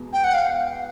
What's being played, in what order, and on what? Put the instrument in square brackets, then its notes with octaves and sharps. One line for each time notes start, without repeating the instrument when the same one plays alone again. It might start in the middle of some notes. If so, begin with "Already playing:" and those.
Already playing: [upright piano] E2 B2 G#3 B3
[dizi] G5
F#5
F5